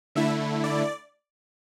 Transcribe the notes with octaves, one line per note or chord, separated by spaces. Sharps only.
D3 A3 E4 E5
D5